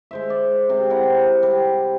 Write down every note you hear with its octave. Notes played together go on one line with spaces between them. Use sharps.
G#3 C5 E5
D5
C3 C5
C4 E4 A#4 F#5
C4
G3